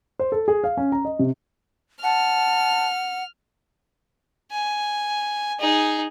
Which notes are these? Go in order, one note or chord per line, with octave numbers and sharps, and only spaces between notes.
C5
A4
G#4
F5
C#4
A#5
D#5
C3
F#5 A5 F6
G#5
D#4 G#4